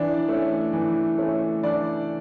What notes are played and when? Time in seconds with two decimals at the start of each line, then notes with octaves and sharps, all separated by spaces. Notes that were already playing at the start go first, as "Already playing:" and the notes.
Already playing: E3 D4 D5
0.29 A3 C#4
0.73 E3
1.18 A3 C#4
1.63 E3 D4 D5